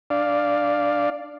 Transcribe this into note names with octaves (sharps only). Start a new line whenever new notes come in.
D4 D5 F5